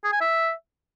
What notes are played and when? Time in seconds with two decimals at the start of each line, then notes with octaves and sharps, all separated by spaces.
0.04 G#4
0.13 G#5
0.21 E5